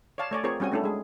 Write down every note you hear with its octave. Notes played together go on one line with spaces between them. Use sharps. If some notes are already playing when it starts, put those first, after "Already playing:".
C#5 D5 F5 A5
A3 C#5 D5 G#5
C4 F4 G#4 A#4 C5 C#5
G3 C4 C#4 F#4 G#5
A3 C#4 D4 E4 A4
G#3 G#4